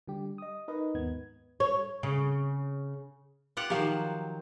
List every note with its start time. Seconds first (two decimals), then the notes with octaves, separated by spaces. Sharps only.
0.08 D3 G3 G4
0.38 D#5 D#6
0.68 D#4 A#4 B4 D#5
0.94 D#2 G#2 B3 G#6
1.60 C#5
2.03 C#3
3.57 F4 G4 F#5
3.70 D#3 F3 F#3 G4 F5